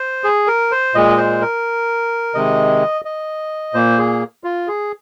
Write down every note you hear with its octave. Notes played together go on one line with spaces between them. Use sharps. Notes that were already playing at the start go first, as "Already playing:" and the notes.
Already playing: C5
G#4
A#4
C5
A#2 G#3 D#5
C5
A#4
C3 D#3 G#3 D#5
D#5
A#2 A#3 C5
G#4
F4
G#4